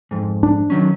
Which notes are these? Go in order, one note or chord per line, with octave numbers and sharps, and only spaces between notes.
F2 G#2
D4
D#3 F#3 C#4